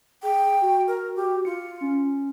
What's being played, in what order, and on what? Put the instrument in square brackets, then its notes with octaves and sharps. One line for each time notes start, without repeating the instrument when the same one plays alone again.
[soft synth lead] G#4 [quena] G5
[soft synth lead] F#4
[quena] A#4
G4
[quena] F4 [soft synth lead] C#7
[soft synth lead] C#4